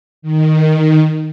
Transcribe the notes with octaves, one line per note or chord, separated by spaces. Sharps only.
D#3